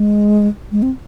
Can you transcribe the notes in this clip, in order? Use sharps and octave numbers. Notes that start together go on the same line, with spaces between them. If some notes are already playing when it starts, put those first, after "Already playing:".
Already playing: G#3
G#3
C4